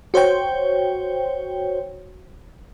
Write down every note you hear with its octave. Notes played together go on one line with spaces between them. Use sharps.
F#4 C5 C#5 G5